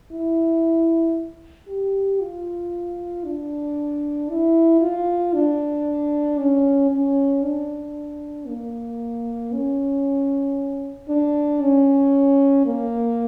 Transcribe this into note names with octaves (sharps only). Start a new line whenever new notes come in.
E4
G4
F4
D4
E4
F4
D4
C#4
C#4
D4
A#3
C#4
D4
C#4
A#3